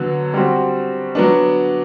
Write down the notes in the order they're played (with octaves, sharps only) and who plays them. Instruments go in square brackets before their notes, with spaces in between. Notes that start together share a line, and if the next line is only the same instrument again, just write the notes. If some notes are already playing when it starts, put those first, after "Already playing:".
Already playing: [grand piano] D3 F#3 B3
G3 C4 F#4
F#3 B3 D4